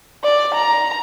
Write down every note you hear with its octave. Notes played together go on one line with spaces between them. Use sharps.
D5
A#5